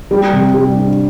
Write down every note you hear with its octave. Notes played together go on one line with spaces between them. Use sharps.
G3
C3
G3
D4